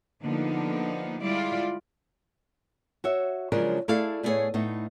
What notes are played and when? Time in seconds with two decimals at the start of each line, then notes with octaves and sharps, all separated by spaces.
0.22 D3 F3 A#3 B3 D4 D#4
1.22 G3 G#3 E4 F4 D5
3.04 F#4 C#5 E5
3.52 C#3 F3 F#3 G#3 D4 A#4
3.88 A3 E4 G#4 A4 D5 F5
4.23 A2 A3 B3 F#4 G#4 C#5
4.54 A2 A3 B3 D#4